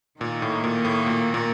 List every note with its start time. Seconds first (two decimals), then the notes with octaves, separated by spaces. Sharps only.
0.21 A#2 D#3 A#3 D#4
0.42 A2
0.64 A#2
0.85 A2
1.06 A#2
1.34 A#2